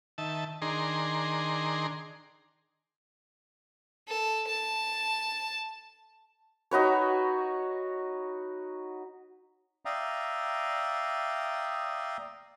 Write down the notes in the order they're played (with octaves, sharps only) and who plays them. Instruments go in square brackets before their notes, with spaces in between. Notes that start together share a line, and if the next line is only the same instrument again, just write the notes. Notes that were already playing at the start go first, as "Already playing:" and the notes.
[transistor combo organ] D#3 E5 A5
D#3 D4 G#4 A#5 C6
[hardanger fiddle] A4
A5
[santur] D#4 F#4 B4 C#5
[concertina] D5 E5 F5 G5 A#5 D#6